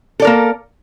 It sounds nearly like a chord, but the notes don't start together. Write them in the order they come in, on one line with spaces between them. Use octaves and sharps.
A4 D5 A#4 A#3